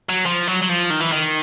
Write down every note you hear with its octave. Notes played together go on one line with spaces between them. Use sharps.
F#3
F3
F#3
F#3
F3
D#3
E3
D#3